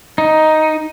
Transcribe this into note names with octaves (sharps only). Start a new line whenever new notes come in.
D#4